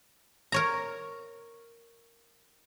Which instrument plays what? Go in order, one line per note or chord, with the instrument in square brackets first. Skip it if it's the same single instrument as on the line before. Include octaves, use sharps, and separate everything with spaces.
[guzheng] A#4 C#5 A#5